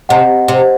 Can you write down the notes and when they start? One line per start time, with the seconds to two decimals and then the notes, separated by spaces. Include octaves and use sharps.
0.09 C3 D#5 F#5
0.48 C3